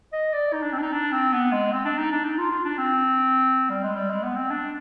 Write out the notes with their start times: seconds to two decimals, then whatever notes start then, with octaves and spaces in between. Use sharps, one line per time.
0.13 D#5
0.33 D5
0.53 D#4
0.62 D4
0.72 C4
0.78 D4
0.82 D#4
0.93 D4
1.12 C4
1.32 B3
1.52 G#3
1.72 C4
1.85 D4
1.98 D#4
2.11 D4
2.24 D#4
2.38 F4
2.51 F4
2.65 D4
2.78 C4
3.70 G3
3.83 G#3
3.96 G3
4.10 G#3
4.23 B3
4.36 C4
4.50 D4